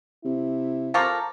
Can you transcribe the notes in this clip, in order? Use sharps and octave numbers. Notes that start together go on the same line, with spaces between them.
C3 E4
F3 A4 A#4 F5 C#6 D6